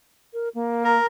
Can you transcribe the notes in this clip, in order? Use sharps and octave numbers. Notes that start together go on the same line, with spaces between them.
A#4
A#3
A#4